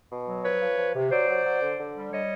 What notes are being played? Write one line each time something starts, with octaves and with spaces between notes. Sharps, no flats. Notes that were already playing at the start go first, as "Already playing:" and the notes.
B2
F#3
F3 B4 C#5
F3
F3
C3
F#3 C5 D5
F#3
F#3
D3
D3
G3
G3 C#5 D#5